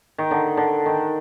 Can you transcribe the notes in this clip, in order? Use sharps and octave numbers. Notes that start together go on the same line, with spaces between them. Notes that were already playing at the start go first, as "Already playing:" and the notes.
D#3
D3
D3
D#3